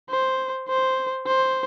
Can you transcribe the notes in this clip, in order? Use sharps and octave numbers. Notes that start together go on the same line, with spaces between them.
C5
C5
C5